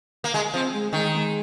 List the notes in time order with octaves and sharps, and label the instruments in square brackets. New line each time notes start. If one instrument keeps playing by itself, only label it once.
[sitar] A#3
G#3
[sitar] F3 [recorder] C4
[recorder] G#3
[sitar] D#3 [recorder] G#3
[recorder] C4
G#3